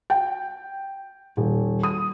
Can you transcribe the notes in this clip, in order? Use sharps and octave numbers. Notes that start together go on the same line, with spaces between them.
G5
D#1
D#6